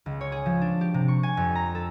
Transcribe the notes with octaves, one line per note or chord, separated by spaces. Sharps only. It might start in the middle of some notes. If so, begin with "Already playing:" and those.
C#2
C#5
G#4
F3
D4
G4
C3
C#6
G#5
F2
A#5
A4